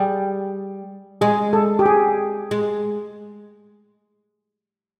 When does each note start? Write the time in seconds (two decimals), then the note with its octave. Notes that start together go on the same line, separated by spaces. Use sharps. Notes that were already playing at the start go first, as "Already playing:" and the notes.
Already playing: G3 G#4
1.21 G#3 G#4
1.53 A4
1.79 G4
1.86 G#4
2.51 G#3